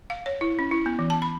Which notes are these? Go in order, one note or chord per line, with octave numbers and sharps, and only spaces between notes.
F5
C#5
E4
C#4
E4
B3
E3
A5
B5